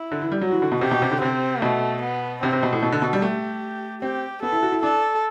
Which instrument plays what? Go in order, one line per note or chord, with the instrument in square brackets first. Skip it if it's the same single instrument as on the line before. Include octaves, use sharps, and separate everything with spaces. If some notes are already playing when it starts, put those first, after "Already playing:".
Already playing: [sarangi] E4
[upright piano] D3
E3
G3
[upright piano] F#3 [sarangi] F#4
[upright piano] E3
D3
B2
[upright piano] C3 [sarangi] G4
[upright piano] B2
C3
D3
[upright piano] C3 [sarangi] C4
[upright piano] B2 [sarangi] A3
[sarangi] B3
[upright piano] C3 [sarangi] C4
[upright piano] C3
B2
A2
[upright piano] B2 [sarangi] A4
[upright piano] D3
B2
G3
[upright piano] A3 [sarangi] G4
[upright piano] C4 [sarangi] G4
[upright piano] B3 [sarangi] A4
[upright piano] E4
F#4
E4
[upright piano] D4 [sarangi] A4